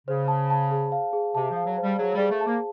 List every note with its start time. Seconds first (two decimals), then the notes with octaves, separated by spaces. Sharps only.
0.08 C#3 C5
0.28 A5
0.50 A5
0.71 G#4
0.92 F5
1.13 G#4
1.35 C3 A5
1.51 F3
1.56 F5
1.66 F#3
1.78 C5
1.83 G3
1.99 F#3 G#4
2.14 G3
2.20 G#4
2.30 A3
2.41 A5
2.46 A#3